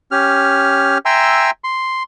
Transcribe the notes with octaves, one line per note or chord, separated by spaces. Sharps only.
C#4 G4 F6
E5 G5 G#5 A#5 C6 E6
C6